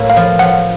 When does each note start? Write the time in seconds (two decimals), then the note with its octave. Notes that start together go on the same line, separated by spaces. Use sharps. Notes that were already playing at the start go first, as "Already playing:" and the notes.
Already playing: A2 A#3
0.10 F5
0.17 F3
0.39 F3 F#5